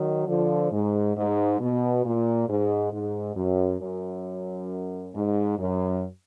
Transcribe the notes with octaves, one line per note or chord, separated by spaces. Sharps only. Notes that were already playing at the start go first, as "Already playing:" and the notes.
Already playing: D#3 F#3
D3 F3
G#2
G#2
B2
A#2
G#2
G#2
F#2
F#2
G#2
F#2